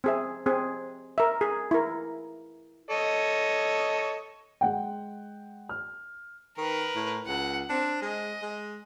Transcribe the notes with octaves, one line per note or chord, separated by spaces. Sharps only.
C4 G#4 E5
C4 G#4
A#4 E5
G#4
E4 A#4
A4 C#5 D#5
G#3 F#5 G5
F6
D#3 A#4 B4
A2
C#2 F#5
C4 D4
G#3 D#5
G#3